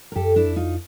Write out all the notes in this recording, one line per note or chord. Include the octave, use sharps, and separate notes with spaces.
A#4
F#2 G4 A4
D4 E4
F2
D#4 F4